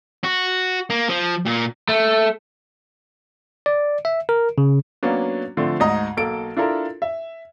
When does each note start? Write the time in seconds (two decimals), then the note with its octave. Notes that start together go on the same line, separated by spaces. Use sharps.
0.24 F#4
0.90 A#3
1.09 F3
1.46 A#2
1.89 A3
3.66 D5
4.05 E5
4.29 A#4
4.58 C#3
5.03 F#3 A#3 B3 C#4 D4
5.57 D3 F3 A3 C4
5.80 D2 G#2 D#5 A#5 D#6
6.17 B1 A#3 A4 A5 D7
6.57 D4 E4 F4 A4 A#4
7.02 E5